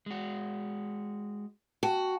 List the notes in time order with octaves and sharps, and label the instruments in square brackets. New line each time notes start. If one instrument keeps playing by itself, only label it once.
[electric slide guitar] G#3 F#4
[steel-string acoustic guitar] F#4 [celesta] G5 A5